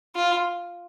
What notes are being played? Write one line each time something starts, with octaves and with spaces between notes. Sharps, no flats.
F4